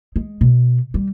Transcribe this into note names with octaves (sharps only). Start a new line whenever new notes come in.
G#3
B2
G3